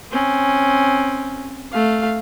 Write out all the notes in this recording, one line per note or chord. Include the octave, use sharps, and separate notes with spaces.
C4 C#4
A3 F5